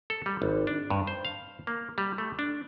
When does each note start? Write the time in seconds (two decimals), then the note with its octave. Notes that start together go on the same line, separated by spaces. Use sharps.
0.10 A4
0.26 G3
0.42 G#1
0.67 D4
0.90 G2
1.07 C5
1.25 F5
1.67 A#3
1.98 G3
2.18 A3
2.39 D4